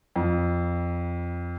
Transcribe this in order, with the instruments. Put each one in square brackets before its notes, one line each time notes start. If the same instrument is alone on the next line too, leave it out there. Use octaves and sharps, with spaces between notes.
[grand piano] F2